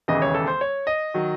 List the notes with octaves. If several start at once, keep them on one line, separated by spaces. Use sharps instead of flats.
E1 D#2 C#3 E3 D#5
C#5
A4
C5
C#5
D#5
D#3 F#3